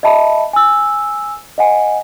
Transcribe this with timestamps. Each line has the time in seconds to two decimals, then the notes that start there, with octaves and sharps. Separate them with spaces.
0.03 D#5 E5 A5 B5
0.53 G#5 E6
1.58 D#5 F#5 G#5